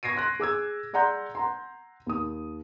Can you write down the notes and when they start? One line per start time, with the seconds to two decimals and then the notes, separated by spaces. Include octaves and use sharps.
0.03 C#6 G#6 A#6 C7 D7 D#7
0.16 C6 F#6 A#6
0.40 G#4 D6 E6 G#6
0.93 G#4 D5 F#5 A#5 C6 G6
1.35 F#5 A#5 C6
2.06 D#2 D#6